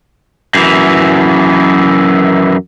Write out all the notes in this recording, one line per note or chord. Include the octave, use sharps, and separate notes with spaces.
F#2 E3